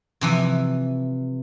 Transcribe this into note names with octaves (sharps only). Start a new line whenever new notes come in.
C3 E3 F3